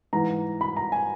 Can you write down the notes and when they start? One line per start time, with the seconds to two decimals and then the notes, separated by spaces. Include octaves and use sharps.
0.13 G#2 E3 A#5
0.61 B5
0.76 A#5
0.92 G#5